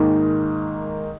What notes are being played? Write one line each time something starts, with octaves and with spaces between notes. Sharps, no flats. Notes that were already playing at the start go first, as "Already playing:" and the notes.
Already playing: G#2 D#3 A#3